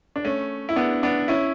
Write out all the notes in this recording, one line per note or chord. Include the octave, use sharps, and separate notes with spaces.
D4
A3 C#4
E4
B3 D4
B3 D4
C#4 E4